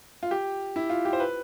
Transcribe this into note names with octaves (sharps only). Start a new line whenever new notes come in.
F4
G4
E4
F4
G4
C5
B4